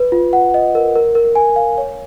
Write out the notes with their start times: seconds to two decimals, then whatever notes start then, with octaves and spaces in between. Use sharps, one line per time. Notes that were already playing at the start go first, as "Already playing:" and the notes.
Already playing: B4
0.12 F4
0.33 F#5
0.54 D#5
0.75 A#4
0.96 A#4
1.15 A#4
1.35 G#5
1.56 F5
1.78 C#5